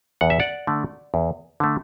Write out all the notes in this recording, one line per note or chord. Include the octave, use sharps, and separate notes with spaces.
E2 F#5
E5
D5 F#5
D3 A3
E2
D3 A3